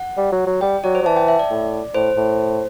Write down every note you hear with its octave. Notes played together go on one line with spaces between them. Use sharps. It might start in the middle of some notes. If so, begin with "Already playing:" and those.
Already playing: F#5
G3
F#3
F#3
G3 G5
F#3 D5
C5
F#3
E3 A5
G5
E5
D5
A2
A2 C5
A2